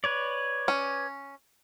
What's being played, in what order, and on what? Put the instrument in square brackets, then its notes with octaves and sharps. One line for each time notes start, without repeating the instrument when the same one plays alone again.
[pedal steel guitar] B4 C#5 D5
[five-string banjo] C#4